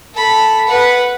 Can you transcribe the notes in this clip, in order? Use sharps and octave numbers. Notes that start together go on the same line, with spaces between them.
A4 B5
B4 F#5